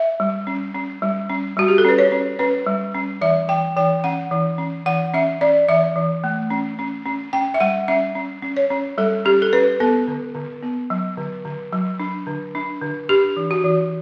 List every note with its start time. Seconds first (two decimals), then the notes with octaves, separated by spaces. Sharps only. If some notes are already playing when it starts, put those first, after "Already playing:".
Already playing: E5
0.20 G3
0.47 C#4
0.75 C#4
1.02 G3
1.29 C#4
1.57 G3 F#4
1.68 G4
1.78 A4
1.85 C#4 B4
1.98 C#5
2.12 C#4
2.39 C#4 B4
2.67 G3
2.94 C#4
3.21 E3 E5
3.48 E3 G5
3.76 E3 G5
4.04 C#4 F#5
4.31 E3
4.58 C#4
4.86 E3 F#5
5.14 C#4 E5
5.41 C#4 D5
5.69 E3 E5
5.96 E3
6.24 A3
6.50 C#4
6.79 C#4
7.06 C#4
7.33 C#4 G5
7.54 E5
7.60 G3 F#5
7.88 C#4 E5
8.15 C#4
8.42 C#4
8.57 C#5
8.70 C#4
8.98 G3 A4
9.25 C#4 G4
9.42 A4
9.53 C#4 B4
9.80 B3 A4
10.08 D3
10.35 D3
10.63 B3
10.90 F#3
11.17 D3
11.45 D3
11.72 F#3
11.99 D4
12.27 D3
12.55 D4
12.82 D3
13.09 D4 G4
13.37 E3
13.51 F#4
13.64 E3